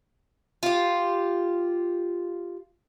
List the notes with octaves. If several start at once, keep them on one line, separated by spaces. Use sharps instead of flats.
F4 G4